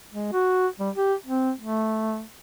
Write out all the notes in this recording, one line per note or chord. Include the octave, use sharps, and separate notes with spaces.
G#3
F#4
G3
G4
C4
A3